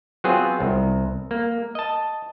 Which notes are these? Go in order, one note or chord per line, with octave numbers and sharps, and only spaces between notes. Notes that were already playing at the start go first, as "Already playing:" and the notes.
F#3 B3 C4 F4 G#4
C2
A#3
D#5 A5